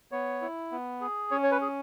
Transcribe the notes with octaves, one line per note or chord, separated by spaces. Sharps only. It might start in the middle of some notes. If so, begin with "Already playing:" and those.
B3 C#5
E4
B3
G#4
C#4 C#5
C#5
B4
G#4